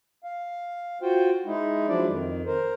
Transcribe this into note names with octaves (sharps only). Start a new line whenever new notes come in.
F5
F4 F#4 C5 G5
G#3 D#4 E4
F3 F#3 G#3 D4 E4 D5
F2 D#3
A#4 C5